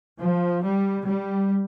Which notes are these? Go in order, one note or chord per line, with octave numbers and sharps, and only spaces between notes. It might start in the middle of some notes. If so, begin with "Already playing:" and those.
F3
G3
G3